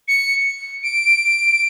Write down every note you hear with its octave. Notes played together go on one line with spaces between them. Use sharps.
C#7
D7